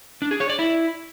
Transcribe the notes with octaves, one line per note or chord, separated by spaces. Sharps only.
D4
G#4
C#5
D5
E4